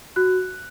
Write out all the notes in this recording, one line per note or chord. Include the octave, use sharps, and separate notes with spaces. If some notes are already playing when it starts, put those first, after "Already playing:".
F#4 F#6